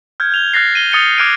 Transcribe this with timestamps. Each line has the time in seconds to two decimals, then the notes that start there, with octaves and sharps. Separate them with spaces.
0.20 F6 G6 G#6
0.32 G6 F7 G7
0.54 F6 F#6 A6 A#6 C7
0.75 D#7 G7
0.92 D#6 A6 C#7 D#7 G7
1.18 D6 F6 F#6 G#6 D7 D#7